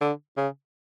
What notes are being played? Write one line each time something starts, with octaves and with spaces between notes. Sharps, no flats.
D3
C#3